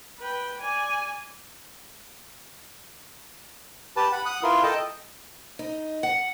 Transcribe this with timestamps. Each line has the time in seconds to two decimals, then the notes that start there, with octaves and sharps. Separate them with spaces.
0.20 B4 G5
0.61 D5 G#5
3.97 G4 B4 A5
4.12 F#5 B5
4.26 F#5 D#6 F#6
4.43 E4 F4 A#4 B4 C6
4.63 A4 D#5 G5 A5
5.59 D#4
6.03 F#5